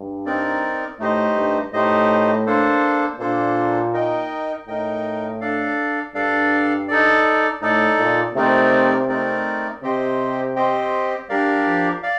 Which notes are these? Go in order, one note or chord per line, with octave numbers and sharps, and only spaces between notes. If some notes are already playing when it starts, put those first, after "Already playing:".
Already playing: G2
C4 D#4 A#4 D5
A2 A3 D#4 G4 C5 D#5
G2
A2 A3 D#4 G4 C5 D#5
A#3 D4 A4 C5
A#2 A#3 D4 A4 C5
D#4 A#4 D#5 G5
A2 D#4 A#4 D#5 G5
D4 A4 D5 F5
G2 D4 A4 D5 F5
D#4 A4 D5
A2 D#4 A4 D5
A#2
C3 A3 C4 D#4 A#4 D5
A3 C4 D#4 A#4 D5
C3 C4 G4 C5 D#5 G5
C4 G4 C5 D#5 G5
G3 D4 G4 A#4 D5 F5
F3
D5 F5